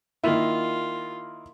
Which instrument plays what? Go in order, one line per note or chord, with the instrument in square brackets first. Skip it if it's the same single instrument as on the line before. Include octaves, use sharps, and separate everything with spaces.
[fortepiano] D#3 A#3 E4 [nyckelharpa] F4